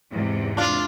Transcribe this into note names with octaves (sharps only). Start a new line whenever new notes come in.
E2 G#2 C3
D4 F4